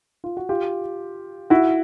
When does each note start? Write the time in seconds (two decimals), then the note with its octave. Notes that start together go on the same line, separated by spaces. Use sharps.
0.24 F4
0.37 F#4
0.49 F4 G4
1.50 E4 F#4